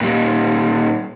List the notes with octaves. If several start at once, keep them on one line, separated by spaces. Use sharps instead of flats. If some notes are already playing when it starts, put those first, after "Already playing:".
A#2 G3